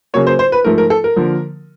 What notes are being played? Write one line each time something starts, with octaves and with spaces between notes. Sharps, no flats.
C#3 F#3 A#3 C#5
C5
C5
B4
G#2 F3 A3 A#4
A#4
A4
A#4
D3 F3 A#3